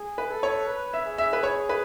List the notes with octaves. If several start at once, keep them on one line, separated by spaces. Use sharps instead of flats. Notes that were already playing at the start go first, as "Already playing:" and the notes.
Already playing: G#4
B4
A4
C#5
B4
E5
G#4
E5
B4
C#5
B4